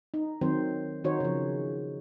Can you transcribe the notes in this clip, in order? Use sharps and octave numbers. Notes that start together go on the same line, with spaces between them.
D#4
D#3 F#3 C4 C5
D#3 D#4 F#4 C5 C#5
C#3 F3